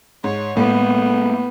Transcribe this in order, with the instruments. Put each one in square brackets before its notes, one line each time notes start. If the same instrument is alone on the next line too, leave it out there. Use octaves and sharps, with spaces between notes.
[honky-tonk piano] G#2 [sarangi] C#5
[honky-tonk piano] A2 [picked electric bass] G#3 A#3 [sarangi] B3